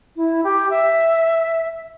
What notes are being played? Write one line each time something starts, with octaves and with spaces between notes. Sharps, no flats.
E4
G4
E5